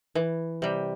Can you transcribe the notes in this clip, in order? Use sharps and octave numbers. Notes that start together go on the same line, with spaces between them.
E3
C3 G3